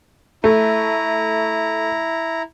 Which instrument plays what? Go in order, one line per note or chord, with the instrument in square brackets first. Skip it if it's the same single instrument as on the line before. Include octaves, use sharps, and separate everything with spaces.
[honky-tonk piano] A3 [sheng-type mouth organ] E4 A#5